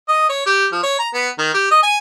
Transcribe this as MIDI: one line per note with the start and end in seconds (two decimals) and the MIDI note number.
0.08 0.28 75
0.30 0.42 73
0.46 0.67 67
0.72 0.80 53
0.83 0.96 73
0.99 1.09 82
1.14 1.29 59
1.39 1.51 51
1.54 1.69 67
1.71 1.83 75
1.83 1.97 80